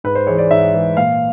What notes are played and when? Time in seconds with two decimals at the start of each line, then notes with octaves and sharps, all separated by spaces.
0.04 G#2 B4
0.15 C5
0.27 E3 G#3 C#5
0.39 D5
0.51 G#2 E5
0.74 E3 G#3
0.97 A#2 F5